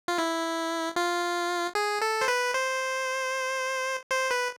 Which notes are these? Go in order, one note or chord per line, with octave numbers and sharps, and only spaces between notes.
F4
E4
F4
G#4
A4
C5
B4
C5
C5
B4